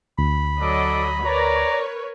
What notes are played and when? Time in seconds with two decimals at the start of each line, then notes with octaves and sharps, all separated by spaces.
0.19 D2 B5
0.60 F#3 D4 A4 D#5 D6
1.24 A#4 B4 C#5 D5 A#5